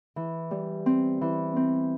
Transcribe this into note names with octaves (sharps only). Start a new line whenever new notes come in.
E3
G3
C4
E3
C4